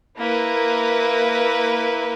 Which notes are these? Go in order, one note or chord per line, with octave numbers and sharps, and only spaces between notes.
A#3 E4 B4